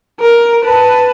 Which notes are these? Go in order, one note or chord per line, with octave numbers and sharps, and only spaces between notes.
A#4
B4 A5